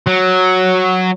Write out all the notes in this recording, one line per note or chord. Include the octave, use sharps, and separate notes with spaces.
F#3